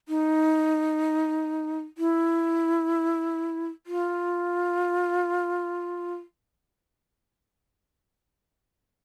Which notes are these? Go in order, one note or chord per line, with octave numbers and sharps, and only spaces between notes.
D#4
E4
F4